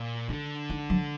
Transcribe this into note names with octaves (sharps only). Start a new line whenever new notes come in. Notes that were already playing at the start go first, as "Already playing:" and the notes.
Already playing: A#2
D3 D4
D#4
F#3